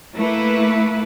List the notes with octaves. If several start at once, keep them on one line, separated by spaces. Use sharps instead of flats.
A3 A#3 E4 B4